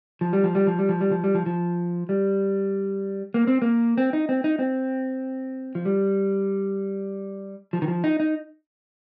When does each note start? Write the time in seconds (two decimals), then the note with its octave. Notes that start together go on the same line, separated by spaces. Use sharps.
0.21 F3
0.33 G3
0.44 F3
0.55 G3
0.67 F3
0.79 G3
0.89 F3
1.01 G3
1.11 F3
1.24 G3
1.35 F3
1.46 F3
2.09 G3
3.34 A#3
3.47 C4
3.62 A#3
3.98 C4
4.13 D#4
4.29 C4
4.44 D#4
4.59 C4
5.75 F3
5.85 G3
7.73 F3
7.82 D#3
7.88 F3
8.04 D#4
8.20 D#4